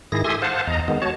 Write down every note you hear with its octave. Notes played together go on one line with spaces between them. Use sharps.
G#2 D#3 E4 G#4 A#6
G4 A4 E5 G#5 C6 D#6
C5 F5 F#5 A5
E2 D#5 A#5
D#3 G#3 B3
F#4 C#5 A5